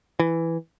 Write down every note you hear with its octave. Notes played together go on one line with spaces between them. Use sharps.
E3